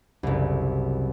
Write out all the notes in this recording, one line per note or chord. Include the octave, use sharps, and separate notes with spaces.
F#1 C2